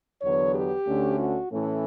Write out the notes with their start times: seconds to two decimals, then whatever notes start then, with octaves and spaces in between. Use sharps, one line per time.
0.21 E2 D3 F#3 B3 C#5
0.54 G4
0.86 D2 D3 A3 C#4
1.18 F#4
1.50 A2 E3 A3 C#4 A4